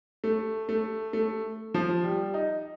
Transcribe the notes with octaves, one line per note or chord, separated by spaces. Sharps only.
A3
A3
A3
F3
G3
D#4